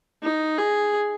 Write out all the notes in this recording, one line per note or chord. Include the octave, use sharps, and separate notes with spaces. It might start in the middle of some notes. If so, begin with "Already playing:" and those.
D#4
G#4